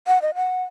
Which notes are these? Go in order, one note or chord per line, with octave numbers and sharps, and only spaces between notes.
F#5
D#5
F#5